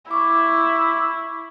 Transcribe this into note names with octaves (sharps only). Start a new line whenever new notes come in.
E4 C#6 D6